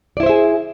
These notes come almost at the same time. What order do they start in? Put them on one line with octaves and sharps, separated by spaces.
D5 E4 C5 E5 G#4